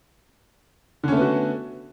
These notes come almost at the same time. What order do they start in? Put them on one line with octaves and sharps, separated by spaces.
D3 C#4 A3 B3 F#4